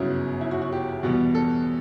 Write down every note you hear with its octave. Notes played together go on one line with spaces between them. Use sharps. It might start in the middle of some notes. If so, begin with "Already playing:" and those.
Already playing: G1 F#2 C#3 F#3 B3 E4
E4
F#4
F#4
G4
E2 B2 G3 B3
A4